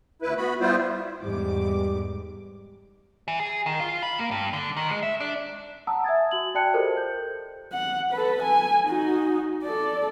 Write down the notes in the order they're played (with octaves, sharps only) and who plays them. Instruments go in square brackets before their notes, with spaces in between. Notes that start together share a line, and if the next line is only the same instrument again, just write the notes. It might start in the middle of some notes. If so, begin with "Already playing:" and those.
[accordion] D2 E4 B4
B3 F#4 B5
G3 B3 E4 F4 C5
[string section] E2 G#2 D6 [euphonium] G3
[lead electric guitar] E3
G#4
D#3
F4
B5
A#3
G2
D3
D#3
G#3
E5
D4
[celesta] F#5 A5 A#5 D#6 E6
E5 G#5 D#6 G#6 A6
F#4 F#7
F#4 D5 G5 A5 F#6 C#7
F4 G4 A4 A#4 C5 D#5
G6
[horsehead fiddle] F#5
A4 B4
G#5
D#4 F#4
A4 D5